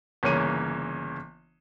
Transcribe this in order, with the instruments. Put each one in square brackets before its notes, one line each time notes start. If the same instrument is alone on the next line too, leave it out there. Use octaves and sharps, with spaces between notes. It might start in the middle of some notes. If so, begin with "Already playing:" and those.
[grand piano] G1 C#3 E3 A#3 C#5 D#7